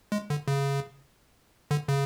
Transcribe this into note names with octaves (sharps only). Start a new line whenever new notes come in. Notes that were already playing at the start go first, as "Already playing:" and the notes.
G#3
D3
C#3
D3
C#3